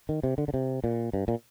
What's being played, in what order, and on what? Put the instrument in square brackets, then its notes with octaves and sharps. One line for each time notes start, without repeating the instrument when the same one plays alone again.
[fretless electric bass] D#3
C3
D3
D3
C3
A#2
G2
A#2